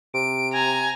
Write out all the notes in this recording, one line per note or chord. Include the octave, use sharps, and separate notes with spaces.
C3 D7
G#5 A#5